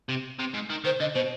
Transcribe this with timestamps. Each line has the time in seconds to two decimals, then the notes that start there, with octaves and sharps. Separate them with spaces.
0.09 C3
0.39 C3
0.54 G#2
0.70 D#3
0.84 D#3 C5
1.00 D3 D#5
1.14 B2 C5